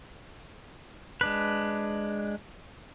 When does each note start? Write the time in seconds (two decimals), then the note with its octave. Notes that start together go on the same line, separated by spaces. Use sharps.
1.21 G#3 D4 B4